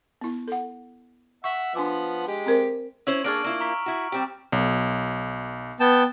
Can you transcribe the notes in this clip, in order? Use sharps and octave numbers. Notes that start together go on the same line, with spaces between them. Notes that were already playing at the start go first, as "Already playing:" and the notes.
B3 E4
A4 F#5
E5 F#5 C#6
F3 B3 D4 G#5 D6
G#3 G4
C4 A#4 C5
C#4 E4 C5 E6 F#7
A#3 D4 G#4 C#6 F6 D7
A#3 E4 F4
A#5 C#6 B6
E4 F#4
G3 C4 G4
B1
B3 G5 A5